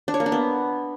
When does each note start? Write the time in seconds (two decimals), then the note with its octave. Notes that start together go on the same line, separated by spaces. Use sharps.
0.08 D4
0.14 C#5
0.20 A#3
0.26 D4
0.32 B3